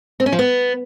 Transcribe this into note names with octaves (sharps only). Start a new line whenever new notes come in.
C4
C#4
F3
B3